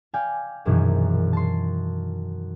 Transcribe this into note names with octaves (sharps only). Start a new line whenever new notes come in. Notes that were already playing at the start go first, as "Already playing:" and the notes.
D5 F5 G5 G#5
A#1 F#2 B2 D#3 E3
A5 C6